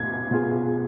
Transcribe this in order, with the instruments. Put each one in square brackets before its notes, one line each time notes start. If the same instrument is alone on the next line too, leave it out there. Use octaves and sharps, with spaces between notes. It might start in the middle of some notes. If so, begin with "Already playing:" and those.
Already playing: [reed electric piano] B2 B3 F4 [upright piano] G#6
[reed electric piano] B2 B3 F4 G#4